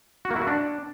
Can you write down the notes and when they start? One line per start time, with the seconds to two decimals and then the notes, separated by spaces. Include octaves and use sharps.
0.25 F#4
0.31 A#3
0.36 E4
0.42 F#4
0.47 D4